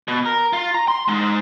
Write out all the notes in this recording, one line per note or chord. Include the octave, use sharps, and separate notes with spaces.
B2
A#4
F4
A#5
C6
G#3 D#4